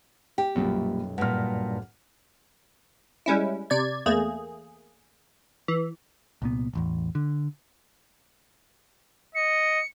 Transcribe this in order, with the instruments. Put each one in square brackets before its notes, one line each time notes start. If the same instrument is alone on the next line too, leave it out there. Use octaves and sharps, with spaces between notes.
[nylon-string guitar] G4 [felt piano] G5
[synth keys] B1 F#2 [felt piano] A#2 G3
[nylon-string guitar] G2 A#2 [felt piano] F#5 F6
[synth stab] G3 G#3 C#4 E4
C3 D5 G#6
E2 A3 A#3 G#4
E3
[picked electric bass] C2 A#2 B3
E1 A1 E2
D3
[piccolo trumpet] D#5 [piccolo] C#7